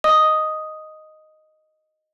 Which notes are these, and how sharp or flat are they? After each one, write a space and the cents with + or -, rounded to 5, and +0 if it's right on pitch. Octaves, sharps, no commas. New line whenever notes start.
D#5 +0 D#6 +0